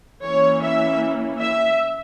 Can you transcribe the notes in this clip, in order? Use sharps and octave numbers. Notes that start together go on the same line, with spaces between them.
E3 A#3 C#4 C#5
E5
E5